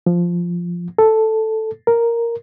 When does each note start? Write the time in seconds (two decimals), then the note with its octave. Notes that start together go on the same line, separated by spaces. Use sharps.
0.06 F3
0.98 A4
1.87 A#4